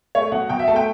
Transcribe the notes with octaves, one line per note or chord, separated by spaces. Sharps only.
A3 C#5
B2 F#5
B2 G5
E5
A3 A5
G5